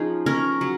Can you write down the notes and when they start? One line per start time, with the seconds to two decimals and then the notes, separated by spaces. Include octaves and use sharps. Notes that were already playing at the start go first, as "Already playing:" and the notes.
Already playing: F3 C#4 D#4 G#4
0.26 C#4 A#4
0.61 F#3